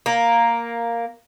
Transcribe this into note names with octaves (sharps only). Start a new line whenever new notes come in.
A#3